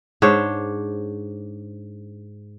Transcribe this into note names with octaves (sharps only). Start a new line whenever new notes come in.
G#2 D4 C5 C#5